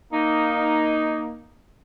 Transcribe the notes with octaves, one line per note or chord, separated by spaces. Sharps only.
A#3 D#4